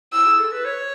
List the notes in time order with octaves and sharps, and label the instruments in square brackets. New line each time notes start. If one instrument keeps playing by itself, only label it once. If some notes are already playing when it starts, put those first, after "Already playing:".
[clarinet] E4 [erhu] E6
[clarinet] G#4
A4
B4
C#5